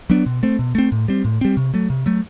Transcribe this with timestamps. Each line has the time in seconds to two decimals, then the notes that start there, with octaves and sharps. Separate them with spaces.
0.10 F#3 B3 D4
0.26 B2
0.43 A3 C4
0.59 B2
0.75 A3 C4
0.92 A2
1.08 G3 C4
1.25 A2
1.41 G3 C4
1.57 C3
1.74 F#3 A3
1.90 C3
2.06 F#3 A3